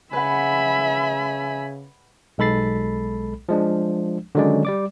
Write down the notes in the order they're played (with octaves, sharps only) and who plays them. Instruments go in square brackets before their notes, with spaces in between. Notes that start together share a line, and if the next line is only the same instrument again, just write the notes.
[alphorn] C#3 [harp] B4 F#5 [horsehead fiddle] E5 B5 [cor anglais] G#5
[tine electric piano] B1 G#3 A4 B5 A6 C7
F3 G#3 D4
D3 D#3 F#3 G#3 C#4 D5
G3 D5 D6